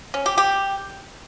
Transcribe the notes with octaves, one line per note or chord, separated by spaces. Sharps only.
C#4
G4
G4